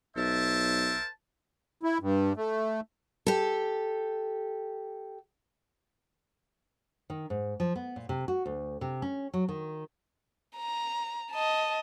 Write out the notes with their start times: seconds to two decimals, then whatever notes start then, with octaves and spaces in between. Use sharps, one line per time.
0.17 B1 A#4 C5 E5 A5
1.83 E4
2.01 G2
2.36 A3
3.27 G4 A4
7.10 D#3
7.30 G#2
7.60 F3
7.76 B3
7.96 A#2
8.09 C3
8.28 F#4
8.46 D2
8.81 C3
9.02 C#4
9.34 F#3
9.49 D#3
10.56 A#5
11.31 D#5 A5